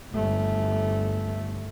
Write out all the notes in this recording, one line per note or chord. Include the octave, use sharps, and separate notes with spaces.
G1 A3